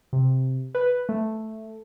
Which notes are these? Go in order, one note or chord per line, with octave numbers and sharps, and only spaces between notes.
C3
B4
A3